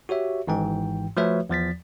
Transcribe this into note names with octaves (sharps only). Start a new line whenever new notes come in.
F#4 G4 C#5 E5
G#1 G#2 E3 G5
F3 A3 F#4 B4 C#5 E5
E2 F3 A6 B6